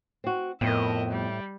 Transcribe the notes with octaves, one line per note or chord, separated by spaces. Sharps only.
C4 F#4
F2 A2 B3 A#4 D#5 E5
G3